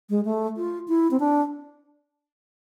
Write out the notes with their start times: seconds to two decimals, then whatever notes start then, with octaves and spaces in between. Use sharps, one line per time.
0.10 G#3
0.25 A3
0.57 F4
0.88 E4
1.11 C4
1.20 D4